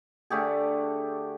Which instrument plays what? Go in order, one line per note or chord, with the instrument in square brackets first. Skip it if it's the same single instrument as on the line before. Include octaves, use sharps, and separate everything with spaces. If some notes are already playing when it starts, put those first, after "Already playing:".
[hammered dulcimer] D3 A3 G4 G#4